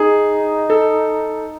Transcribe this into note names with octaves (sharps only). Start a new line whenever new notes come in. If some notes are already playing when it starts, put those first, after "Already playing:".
Already playing: D#4 G#4
A4